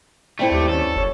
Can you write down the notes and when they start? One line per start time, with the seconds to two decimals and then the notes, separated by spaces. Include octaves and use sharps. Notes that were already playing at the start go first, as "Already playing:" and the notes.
0.39 G2 A3 C4 E4 G5
0.51 D#2 G4
0.69 C#4 A4
0.96 F#1 C#5